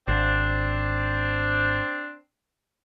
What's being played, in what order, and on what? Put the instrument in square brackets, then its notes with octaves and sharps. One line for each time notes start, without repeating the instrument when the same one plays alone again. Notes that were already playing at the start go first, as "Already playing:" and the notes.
[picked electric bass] G#1 [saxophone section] C4 D4